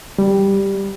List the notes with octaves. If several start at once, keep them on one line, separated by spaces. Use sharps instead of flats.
G3